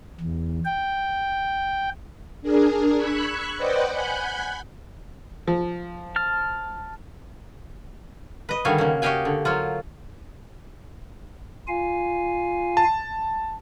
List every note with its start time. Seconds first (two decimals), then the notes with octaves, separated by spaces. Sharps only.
0.21 E2
0.65 G5
2.42 D4 G#4 A#4
2.95 B5 C#6 E6 F#6 G#6
3.56 B4 C5 D5 D#5 F#5 G5
3.91 F#5 G#5 B5 F#6 G6
5.47 F3
6.16 A5 F6
8.49 B4 D#5
8.65 D3 D#3 G3 F#4 F5 G#5
8.78 C#3 A#3
9.02 F#4 G4 D#5 F5 G5 G#5
9.25 D3
9.45 F#3 A#3 F4
11.68 F4 F5 G#5
12.77 A5